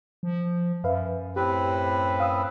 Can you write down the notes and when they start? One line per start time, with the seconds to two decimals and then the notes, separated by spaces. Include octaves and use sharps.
0.23 F3
0.84 F#2 B4 E5 F5
1.36 A2 C4 G4 B4
2.20 F5 D#6 E6